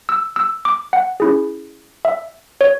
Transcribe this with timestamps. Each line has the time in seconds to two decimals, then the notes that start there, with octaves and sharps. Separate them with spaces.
0.09 E6
0.36 E6
0.65 D6
0.93 F#5
1.20 C#4 E4 G#4
2.05 E5
2.61 C#5